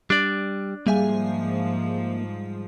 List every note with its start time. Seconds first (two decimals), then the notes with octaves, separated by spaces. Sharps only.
0.10 G3 D4 D5
0.87 G#2 F3 G3 A#3 G#4 E5 F5 G#5